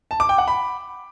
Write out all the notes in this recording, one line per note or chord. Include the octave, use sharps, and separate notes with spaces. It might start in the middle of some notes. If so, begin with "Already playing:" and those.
A5
D6
G5
F#5
B5